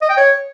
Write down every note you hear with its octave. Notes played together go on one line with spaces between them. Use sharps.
D#5
G5
C#5